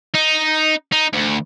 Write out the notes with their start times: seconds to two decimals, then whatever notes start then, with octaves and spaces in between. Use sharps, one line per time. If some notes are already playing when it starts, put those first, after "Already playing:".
0.15 D#4
0.93 D#4
1.13 D2